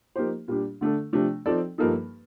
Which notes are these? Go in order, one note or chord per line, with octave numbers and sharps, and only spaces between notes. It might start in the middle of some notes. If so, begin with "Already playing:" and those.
F3 A#3 D#4 G4 C5
A#2 G3 D4 G4
D3 A3 D4 A4
C3 F3 A3 D4
F3 C4 D#4 A4 D5
G2 F3 A#3 D#4 A4